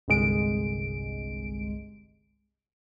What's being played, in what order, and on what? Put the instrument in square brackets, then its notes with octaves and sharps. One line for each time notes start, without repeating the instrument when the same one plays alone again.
[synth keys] G1 C2 G#3 D7